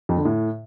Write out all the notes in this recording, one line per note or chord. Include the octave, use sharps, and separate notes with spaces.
F2
D3
A2